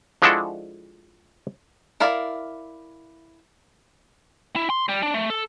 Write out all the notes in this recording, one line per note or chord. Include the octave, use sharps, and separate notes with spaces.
F3 G#3 D4 E4 F#4 A4
E4 A#4 D5 F5
E4
C6
G3
D4
A3
A4